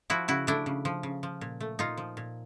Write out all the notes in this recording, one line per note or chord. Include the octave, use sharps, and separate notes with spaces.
F3 E4 F#4
C#3 E4 F#4
A3 D4 E4
C#3
F3
C#3
F3
A#2
A3
A#2 D#4 F4
F3
A#2